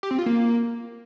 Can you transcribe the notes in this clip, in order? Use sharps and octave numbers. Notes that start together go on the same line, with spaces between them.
G4
C4
F4
A#3